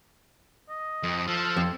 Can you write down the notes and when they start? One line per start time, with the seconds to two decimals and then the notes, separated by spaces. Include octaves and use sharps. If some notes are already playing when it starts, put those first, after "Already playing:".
0.69 D#5
1.03 F2
1.28 F3 A4
1.56 F2